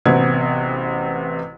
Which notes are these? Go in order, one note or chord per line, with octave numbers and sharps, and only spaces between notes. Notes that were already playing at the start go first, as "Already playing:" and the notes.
A1 C3 B3 F#4 G#6